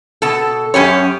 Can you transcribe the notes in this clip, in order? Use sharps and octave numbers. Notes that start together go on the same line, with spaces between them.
B2 A4
F#2 C#4 G4 C#5